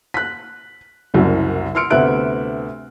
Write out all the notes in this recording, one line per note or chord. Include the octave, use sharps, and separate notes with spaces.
F#6 B6
F#1 C2 F#2
C6 E6 F6 C#7 D7
D2 C3 B3 E5 F#6 D7